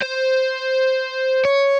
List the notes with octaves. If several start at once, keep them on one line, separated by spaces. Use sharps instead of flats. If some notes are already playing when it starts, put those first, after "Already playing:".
C5
C#5